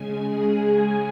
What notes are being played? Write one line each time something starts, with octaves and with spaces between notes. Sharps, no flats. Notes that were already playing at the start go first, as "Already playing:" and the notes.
Already playing: C#3 G#3 G#5
G#4